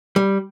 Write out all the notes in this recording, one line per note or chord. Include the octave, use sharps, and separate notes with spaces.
G3